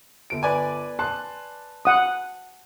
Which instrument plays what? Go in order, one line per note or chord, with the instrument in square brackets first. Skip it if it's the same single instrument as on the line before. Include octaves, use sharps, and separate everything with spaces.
[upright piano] G1 D7
[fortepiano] B4 D5 G#5
[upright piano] A5 C6 F#6
[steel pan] F#5 D#6